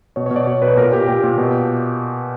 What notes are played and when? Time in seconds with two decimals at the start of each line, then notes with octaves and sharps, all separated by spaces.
0.16 B2 C#5
0.26 B2 C#5
0.36 D5
0.47 B2 C#5
0.62 B2 B4
0.77 A#2 A#4
0.92 A#2 G4
1.08 A#2 G4
1.23 A#2
1.38 B2